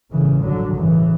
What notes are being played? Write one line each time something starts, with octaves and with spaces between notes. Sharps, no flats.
A1 G2 C#3 E3
D3 F#3
A1 G2 C#3 E3